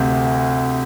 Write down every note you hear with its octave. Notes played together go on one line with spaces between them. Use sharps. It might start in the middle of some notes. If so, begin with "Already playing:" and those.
Already playing: D2 C3